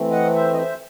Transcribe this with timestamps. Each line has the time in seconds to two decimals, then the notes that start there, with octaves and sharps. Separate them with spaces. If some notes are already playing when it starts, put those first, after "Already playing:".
Already playing: E3 A3 C4
0.11 D#5 F#5
0.35 C5 E5
0.53 D#5
0.57 C5 E5